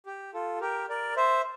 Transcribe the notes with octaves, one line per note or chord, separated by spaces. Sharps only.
G4
F4 A4
G4 A#4
A#4 D5
C5 E5